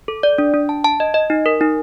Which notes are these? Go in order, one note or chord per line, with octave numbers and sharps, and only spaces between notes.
A4
D5
D4
D4
A5
A5
D#5
D#5
D#4
A#4
D#4